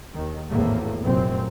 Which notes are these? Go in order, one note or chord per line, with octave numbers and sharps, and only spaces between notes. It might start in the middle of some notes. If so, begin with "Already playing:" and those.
D#2 D#3
G#1 E2 A2 A3 A#3
F1 F#2 A#2 C4